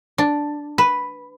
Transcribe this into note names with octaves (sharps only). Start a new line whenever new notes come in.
D4
B4